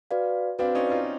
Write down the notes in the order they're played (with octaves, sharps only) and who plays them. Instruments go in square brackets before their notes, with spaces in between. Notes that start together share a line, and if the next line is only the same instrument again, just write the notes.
[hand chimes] F#4 B4 D5 F5
[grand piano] C4 D4 [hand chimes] F#4 B4 D5 F5
[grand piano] C#4 D#4
D#4 F4